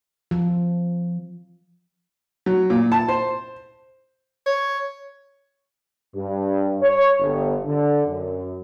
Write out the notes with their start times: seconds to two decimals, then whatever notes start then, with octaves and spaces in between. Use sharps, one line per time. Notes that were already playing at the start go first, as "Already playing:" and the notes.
0.31 F3
2.46 F#3
2.70 A#2
2.92 A5
3.08 C5
4.46 C#5
6.15 G2
6.82 C#5
7.21 G1
7.66 D3
8.06 F#2